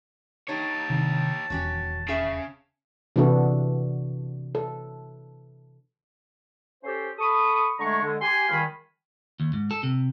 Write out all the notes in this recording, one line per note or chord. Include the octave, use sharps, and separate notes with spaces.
D#4 G4 C#5 A5
C3 D#3 D4
D#1 E2 F#3 C#4 G4
C#3 C#4 G#4 E5
C3 E3 B3 D4 F#4 A4
A4
C#4 G4 A4 C5
A4 B5 C#6 D#6
D3 G#3 A3 A#5 C#6
D3 G#3
G4 G#5 C6
C#2 D#3 G3 F5 G#5 B5
D#2
G#2
A4
C3